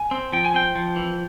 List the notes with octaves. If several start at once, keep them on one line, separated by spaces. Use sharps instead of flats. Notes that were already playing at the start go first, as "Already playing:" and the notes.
Already playing: G#5
C4
F3 G5
G#5
C4 G5
F3
E3